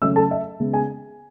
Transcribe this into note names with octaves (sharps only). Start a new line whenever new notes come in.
C#3 F#3 A3 C#4 E5 E6
A4 A5
E5
C#3 G#3 B3
G#4 G#5